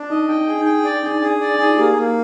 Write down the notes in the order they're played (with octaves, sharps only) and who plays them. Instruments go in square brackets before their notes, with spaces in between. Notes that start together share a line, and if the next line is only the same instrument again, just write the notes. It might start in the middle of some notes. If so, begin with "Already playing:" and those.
Already playing: [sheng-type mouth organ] D4
[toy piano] D#4 [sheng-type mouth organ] D#5
[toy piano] D#4 [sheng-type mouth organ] G5
[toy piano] D4
[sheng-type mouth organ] G#4
[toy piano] D4
D#4
[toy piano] D4 [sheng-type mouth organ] G5
[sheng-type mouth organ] D5
[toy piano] D4 [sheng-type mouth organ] G#4
[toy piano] D#4
[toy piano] D4 [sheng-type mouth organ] G#4
[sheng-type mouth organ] D5
[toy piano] D4
[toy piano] D#4 [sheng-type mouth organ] G#4
[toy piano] F4
[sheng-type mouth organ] A#3 [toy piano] G4
[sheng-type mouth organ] A#3